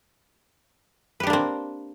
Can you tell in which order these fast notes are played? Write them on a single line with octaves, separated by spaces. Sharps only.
B4 G4 D4 A#3 C4